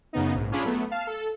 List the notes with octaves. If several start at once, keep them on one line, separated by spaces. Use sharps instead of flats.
F#2 C#3 B3 D#4
A#1 G#2
C#4 D4 F4 G#4 B5
F#3 A3 B3
F5 A5
A4